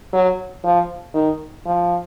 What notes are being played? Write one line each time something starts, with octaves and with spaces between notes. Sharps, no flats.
F#3
F3
D#3
F3